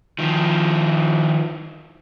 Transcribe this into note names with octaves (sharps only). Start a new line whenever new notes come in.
D#3 F3